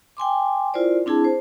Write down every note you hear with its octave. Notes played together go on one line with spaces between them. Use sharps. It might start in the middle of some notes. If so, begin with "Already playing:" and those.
G5 G#5 C6 D6
E4 F4 A#4 C5 D5
C4 D4 E4 G#4 A5
C5